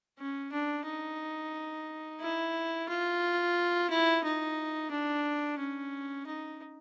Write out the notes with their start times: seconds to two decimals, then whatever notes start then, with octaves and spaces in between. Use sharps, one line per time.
0.19 C#4
0.53 D4
0.86 D#4
2.21 E4
2.89 F4
3.90 E4
4.24 D#4
4.91 D4
5.59 C#4
6.27 D#4